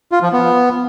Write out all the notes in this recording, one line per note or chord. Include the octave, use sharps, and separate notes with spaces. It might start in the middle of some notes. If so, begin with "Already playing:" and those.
F4
F3
B3